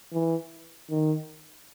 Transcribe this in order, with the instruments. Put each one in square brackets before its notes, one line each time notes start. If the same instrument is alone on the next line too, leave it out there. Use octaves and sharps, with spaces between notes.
[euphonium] E3
D#3